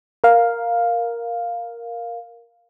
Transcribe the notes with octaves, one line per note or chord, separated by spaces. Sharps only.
A#4 F5